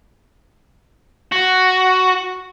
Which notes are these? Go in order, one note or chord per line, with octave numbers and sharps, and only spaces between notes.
F#4